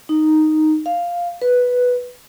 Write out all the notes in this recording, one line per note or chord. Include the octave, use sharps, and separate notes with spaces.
D#4
F5
B4